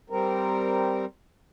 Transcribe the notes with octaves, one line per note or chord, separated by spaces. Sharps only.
G3 C4 A#4